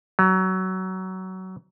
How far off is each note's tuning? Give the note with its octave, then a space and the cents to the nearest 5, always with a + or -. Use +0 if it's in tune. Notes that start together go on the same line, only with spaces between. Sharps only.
F#3 +20